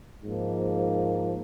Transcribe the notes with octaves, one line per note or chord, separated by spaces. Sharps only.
G#2 F3 A#3